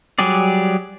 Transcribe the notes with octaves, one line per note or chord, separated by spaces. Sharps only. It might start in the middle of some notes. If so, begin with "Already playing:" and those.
F#3 G3 G4 G#4 D5